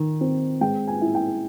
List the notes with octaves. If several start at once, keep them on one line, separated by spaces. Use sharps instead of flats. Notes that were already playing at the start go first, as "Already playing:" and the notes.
Already playing: D#3
C4
G#3 G5
G#5
E4
G5